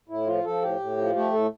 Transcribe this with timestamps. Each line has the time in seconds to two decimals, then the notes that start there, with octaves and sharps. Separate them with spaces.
0.08 A2 E4
0.27 F3 F4
0.45 F3 A4
0.62 A2 G4
0.80 A2
0.98 F3
1.15 A3 G4
1.32 A2 A4